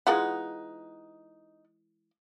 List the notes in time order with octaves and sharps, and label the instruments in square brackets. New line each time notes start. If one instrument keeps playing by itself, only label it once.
[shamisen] E3 G#3 F4 [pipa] B3 D#4 F#5